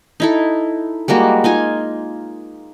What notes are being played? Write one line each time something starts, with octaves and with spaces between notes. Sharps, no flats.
D#4 E4 A4
G3 G#3 A#3 F#4
D#4 F4 G#5